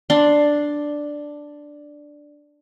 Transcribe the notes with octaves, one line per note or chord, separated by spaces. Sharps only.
D4 C6